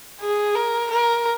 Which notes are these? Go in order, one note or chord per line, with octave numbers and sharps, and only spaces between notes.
G#4
A#4
A#4